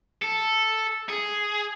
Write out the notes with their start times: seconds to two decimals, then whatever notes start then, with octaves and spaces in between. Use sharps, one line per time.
0.22 A4
1.09 G#4